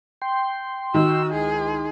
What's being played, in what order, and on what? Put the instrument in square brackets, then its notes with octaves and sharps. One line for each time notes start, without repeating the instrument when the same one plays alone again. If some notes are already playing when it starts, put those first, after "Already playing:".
[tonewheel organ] G5 C6
[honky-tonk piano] D#3 [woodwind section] F#4 [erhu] E6
[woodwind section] C#2 E4 C6 [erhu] G#4